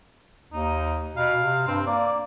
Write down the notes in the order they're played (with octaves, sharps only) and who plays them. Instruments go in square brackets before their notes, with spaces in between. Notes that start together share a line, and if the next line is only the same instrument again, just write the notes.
[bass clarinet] D#2 [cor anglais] D#4
[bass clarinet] B2 [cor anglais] F5
[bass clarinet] C3
[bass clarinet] G2 [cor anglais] C4
[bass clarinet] A#3 [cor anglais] D5